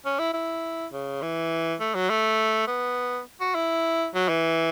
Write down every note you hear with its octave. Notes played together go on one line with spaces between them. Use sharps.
C#4
E4
E4
C#3
E3
A3
F#3
A3
B3
F#4
E4
F#3
E3